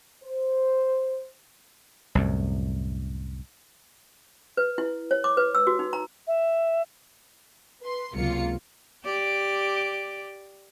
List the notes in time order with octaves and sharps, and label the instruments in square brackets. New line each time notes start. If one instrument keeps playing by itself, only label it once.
[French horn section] C5
[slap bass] C2 F#2 A2
[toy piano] B4
E4
C#5
D6
B4
E6
F#4
D#4
A#5
[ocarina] E5
[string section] B4 C6
C#2 C3 F#3 A#3 F4 C#7
[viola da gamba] G4 D5